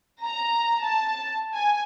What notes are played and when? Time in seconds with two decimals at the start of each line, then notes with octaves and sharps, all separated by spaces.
0.25 A#5
0.84 A5
1.55 G#5